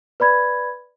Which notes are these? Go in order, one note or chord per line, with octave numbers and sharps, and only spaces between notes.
B4 D5 B5 G#6